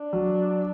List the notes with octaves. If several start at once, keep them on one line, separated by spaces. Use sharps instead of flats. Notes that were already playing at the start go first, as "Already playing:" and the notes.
Already playing: D4
F#3